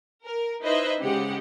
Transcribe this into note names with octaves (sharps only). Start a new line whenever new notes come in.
A#4
D#4 E4 B4 C5 D#5 E5
C#3 G#3 G4 F#5